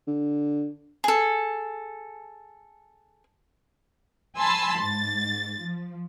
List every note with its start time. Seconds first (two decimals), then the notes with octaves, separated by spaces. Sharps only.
0.07 D3
1.04 G#4 A4
4.38 G#5 A5 B5 C6 E6
4.79 G#2 A6
5.59 F3